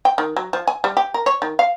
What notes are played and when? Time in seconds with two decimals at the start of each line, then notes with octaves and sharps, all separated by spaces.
0.05 G5
0.18 D#3
0.37 F#3
0.53 F3
0.67 G#5
0.84 G3
0.97 G4
1.14 A#4
1.26 C#5
1.42 D#3
1.59 F5